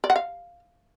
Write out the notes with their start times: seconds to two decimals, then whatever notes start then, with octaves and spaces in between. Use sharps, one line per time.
0.04 D5
0.10 F#5
0.16 F5